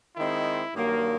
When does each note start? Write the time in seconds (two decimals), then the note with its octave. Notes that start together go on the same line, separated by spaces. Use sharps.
0.16 D#3 G#3 C4 E4
0.73 G2 D#3 F#3 A#3